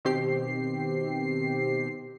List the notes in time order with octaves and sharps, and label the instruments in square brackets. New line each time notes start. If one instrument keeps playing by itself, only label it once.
[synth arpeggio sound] B2 D#3 C4 G4 C7